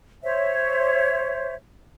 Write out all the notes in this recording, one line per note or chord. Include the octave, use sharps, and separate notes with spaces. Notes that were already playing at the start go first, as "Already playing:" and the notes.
C5 C#5 E5